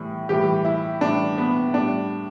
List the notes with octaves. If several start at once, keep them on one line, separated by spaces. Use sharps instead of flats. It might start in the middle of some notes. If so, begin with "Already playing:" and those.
Already playing: A2 E3 G3
A2 E3 G3 G4
E4
A2 E3 G3 D4
B3
A2 G3 D4